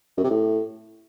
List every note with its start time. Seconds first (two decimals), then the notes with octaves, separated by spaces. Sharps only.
0.17 F#2
0.24 C3
0.30 A2